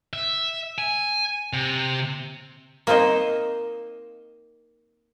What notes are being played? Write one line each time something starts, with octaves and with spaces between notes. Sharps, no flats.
E5
G#5
C3
A#3 C4 D#4 C5 D#5